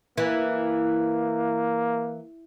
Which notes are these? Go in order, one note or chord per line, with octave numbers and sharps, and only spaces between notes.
E3 A#3